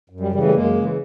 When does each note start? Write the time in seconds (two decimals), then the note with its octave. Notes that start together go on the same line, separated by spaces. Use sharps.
0.10 F#2
0.20 G3
0.32 C#3 E3 G3
0.43 G3 A3
0.53 F#2 G#3 A#3
0.75 C#3 E3